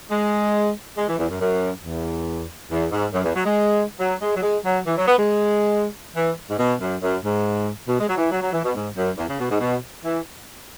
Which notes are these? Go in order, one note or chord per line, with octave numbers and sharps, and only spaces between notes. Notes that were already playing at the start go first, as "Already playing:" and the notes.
G#3
G#3
E3
E2
F#2
F#2
E2
E2
G#2
F#2
E2
F#3
G#3
F#3
G#3
F#3
G#3
F#3
E3
F#3
B3
G#3
E3
G#2
B2
F#2
F#2
G#2
B2
G#3
F#3
E3
F#3
F#3
E3
B2
G#2
F#2
E2
C#3
B2
G#2
B2
E3